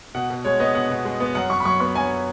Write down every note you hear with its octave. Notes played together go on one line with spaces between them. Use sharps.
B2 F#5
B2
G#3 C#5
B3 D#5
B2 F#5
B2
G#3
B3
F#2 F#5
F#2 C#6
B5
F#3 C#6
B3 C#6
F#2 G#5